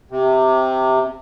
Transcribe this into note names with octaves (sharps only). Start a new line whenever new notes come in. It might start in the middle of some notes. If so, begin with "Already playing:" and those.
C3